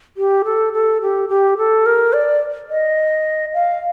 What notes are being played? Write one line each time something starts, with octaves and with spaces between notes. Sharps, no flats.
G4
A4
A4
G4
G4
A4
A#4
D5
D#5
F5